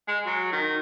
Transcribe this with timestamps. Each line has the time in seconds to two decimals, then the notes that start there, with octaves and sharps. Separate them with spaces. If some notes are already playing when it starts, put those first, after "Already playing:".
0.07 G#3
0.26 F#3
0.52 D#3